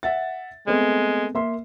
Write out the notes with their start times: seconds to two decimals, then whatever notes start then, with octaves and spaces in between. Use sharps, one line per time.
0.03 E5 F#5 A6
0.67 G#3 A3 B3 C4
1.35 A#3 E5 C6